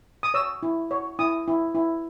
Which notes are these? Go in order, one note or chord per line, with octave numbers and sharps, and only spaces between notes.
D#6
C#5 E6
E4
C#5
E4 D#6
E4
E4